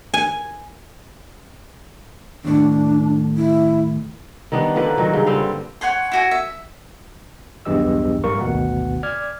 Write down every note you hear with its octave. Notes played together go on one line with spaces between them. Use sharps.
G#5
D#2 A2 D4
E4
D#3 G3 B3 D4
D3 F3 A#3 B4
A#2 D#3 F#3
G2 C#3
D3 G3 C4 F5
C#5 F#5 G#5 C6
E4 F#4 G#5
E5
B1 E2 G2 G4 D#5 E6
A#1 G#2 G3 A#3 A#4 C#6
G#1 D2 B2 B3 F#5
D5 D6 F6 G#6